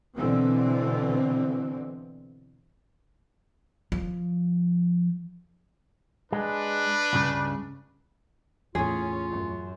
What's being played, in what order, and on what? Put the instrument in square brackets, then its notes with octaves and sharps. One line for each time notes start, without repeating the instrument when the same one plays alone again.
[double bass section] B2 D3 E3 C4
[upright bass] F3
[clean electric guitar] G#3 [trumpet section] D4 B4
[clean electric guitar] C#2 G2 C#3
[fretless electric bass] E2 A2 [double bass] C#4 [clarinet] F4 [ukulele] G#4
[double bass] F#2